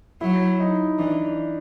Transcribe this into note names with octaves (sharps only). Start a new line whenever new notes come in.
F#3 E4
D#4
E3 D4